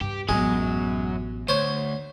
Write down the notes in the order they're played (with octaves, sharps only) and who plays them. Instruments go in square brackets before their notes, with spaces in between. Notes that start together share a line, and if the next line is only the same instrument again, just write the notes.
[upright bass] G2 [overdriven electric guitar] G4
[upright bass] A1 B3 [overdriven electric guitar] F#2 F#3 [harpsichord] G#3
[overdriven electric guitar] D2 [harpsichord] C5 C#5